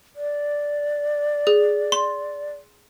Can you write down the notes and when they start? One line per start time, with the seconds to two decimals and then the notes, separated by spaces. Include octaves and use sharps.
0.16 D5
1.47 G#4
1.92 C6